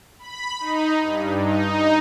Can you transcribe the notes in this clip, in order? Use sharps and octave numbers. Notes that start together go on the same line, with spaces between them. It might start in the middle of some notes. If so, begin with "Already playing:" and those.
B5
D#4
G2
D#4